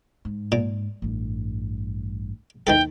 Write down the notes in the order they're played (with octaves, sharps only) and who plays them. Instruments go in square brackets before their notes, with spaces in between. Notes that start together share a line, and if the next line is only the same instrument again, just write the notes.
[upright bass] G#2
[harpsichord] A#2
[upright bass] A1 G2
[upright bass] D#2 [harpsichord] D#3 E3 A4 [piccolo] G5